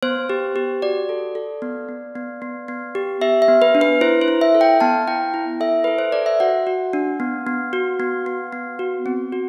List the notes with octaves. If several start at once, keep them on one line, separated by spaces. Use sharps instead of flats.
B3 C5
G4
G4
F#4 D5
A4
A4
B3
B3
B3
B3
B3
G4
G4 E5
E5
B3
B4
D4
B4
E4 C5
C5
E4
E5
A4
G5
B3 A5
E4 G5
E4
A4 E5
A4 B4
C5
A4 D5
E5
F#4 F#5
F#4
D4
B3
B3
F#4
B3
B3
B3
F#4
C4
F#4